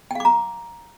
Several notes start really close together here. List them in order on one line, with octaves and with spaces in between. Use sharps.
G5 F5 D6 A#5